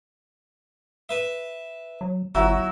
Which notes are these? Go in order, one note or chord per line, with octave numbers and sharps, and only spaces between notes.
B4 E5
F#3
G1 F#3 E4 F#4